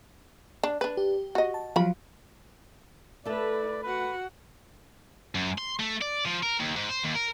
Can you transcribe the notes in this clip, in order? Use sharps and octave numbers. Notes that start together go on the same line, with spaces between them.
D4
D4 B4
G4
F#4 D#5
A5
F3 F#3 F4 B5
A3 E4 A4 B4 D5
F#4 B4 F#5
F#2
C6
A3
D5
F3
A#4
D#2
G#2
C5
D#2
A#4